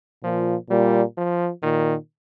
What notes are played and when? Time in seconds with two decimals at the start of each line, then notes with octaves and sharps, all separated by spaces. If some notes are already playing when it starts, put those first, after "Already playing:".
0.23 A#2 F3
0.70 A#2 G3
1.17 F3
1.63 A#2 D#3